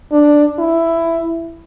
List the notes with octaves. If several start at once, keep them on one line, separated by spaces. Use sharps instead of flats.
D4
E4